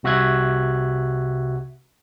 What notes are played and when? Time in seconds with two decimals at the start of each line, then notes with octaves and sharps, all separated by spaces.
0.03 C2 C3 F#4 E5 F#6 G#6